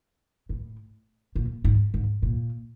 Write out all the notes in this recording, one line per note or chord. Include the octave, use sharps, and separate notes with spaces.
A2
A#2
G#2
G#2
A#2